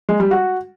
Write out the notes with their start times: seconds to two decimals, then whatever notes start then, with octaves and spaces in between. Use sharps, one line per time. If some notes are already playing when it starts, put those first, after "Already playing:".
0.09 G#3
0.20 G3
0.31 F#4